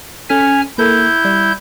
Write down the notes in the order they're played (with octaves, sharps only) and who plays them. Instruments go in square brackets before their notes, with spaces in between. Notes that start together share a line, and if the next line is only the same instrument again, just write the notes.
[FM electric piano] C#4 A4 B6 [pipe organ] G#5 F6
[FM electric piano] A#3 A4 A#4 [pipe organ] E4 G6
[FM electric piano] G3 D5